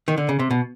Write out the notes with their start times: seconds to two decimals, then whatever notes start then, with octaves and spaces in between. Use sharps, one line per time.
0.08 D#3
0.18 D3
0.29 C#3
0.39 C3
0.51 B2